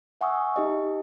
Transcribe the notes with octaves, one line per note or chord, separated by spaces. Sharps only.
E5 F#5 G#5 C#6 D#6 E6
D#4 G4 D#5